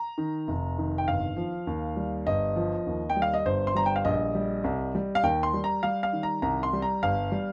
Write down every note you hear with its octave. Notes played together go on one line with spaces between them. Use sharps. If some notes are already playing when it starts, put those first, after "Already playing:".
Already playing: A#5
D#3
F1
D#3
G5
G1 F5
F3
D#2
G3
G1 D#5
F3
D#2
G5
G3
F5
D#5
G1 C5
C6
G3 A#5
G5
F5
A#1 D#5
G3
C2
G3
F5
D#2 G5
C6
G3
A#5
G3 F5
F5
D#3
A#5
C2 A#5
C6
G3
A#5
G1 F5
G3